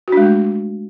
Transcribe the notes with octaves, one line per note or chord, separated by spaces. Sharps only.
G#3 A3 D4 F#4